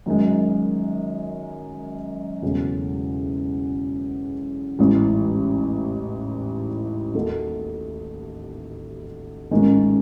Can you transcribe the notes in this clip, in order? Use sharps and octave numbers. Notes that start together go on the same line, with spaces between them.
F#2 D#3 G#3
E1 E2 C#3 F#3 A3
A1 G#2 E3
D#2 D#3 A3 D#4 F#4
A1 G#2 D#3 G#3 C#4